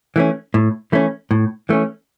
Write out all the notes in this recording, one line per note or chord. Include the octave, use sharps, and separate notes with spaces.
E3 A3 C#4
A2
E3 A3 C#4
A2
E3 A3 C#4